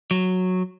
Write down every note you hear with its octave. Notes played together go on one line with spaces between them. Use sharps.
F#3